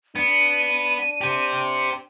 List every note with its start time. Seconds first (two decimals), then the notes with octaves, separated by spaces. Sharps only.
0.16 B3 D4 D#7
1.21 G4 C5